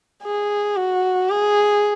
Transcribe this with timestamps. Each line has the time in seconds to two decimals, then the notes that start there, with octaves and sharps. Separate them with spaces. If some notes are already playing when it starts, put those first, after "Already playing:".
0.24 G#4
0.76 F#4
1.30 G#4